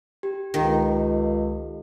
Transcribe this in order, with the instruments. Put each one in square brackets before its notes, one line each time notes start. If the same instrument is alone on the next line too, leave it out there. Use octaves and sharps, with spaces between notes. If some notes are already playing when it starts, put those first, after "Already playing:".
[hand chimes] G4
[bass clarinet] C#2 [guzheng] D#3 [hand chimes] F4 G4 A4